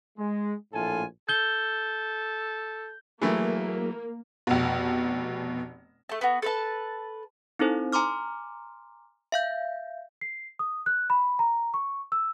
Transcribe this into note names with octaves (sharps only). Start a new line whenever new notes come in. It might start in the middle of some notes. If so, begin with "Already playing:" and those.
G#3
A#1 A2 A3 F4 A4 G#5
A4 G6 G7
E3 F#3 A3 A#3 E4 G#4
F1 B2
A3 A5
B3 F#4
A4 B4 A5
C4 D#4 E4 A4 C5
G#5 A#5 C6 D6 F6
E5 F5 G6
C7
D#6
F#6
B5
A#5
C#6
E6